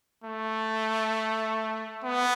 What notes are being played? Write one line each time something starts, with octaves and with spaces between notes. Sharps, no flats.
A3
B3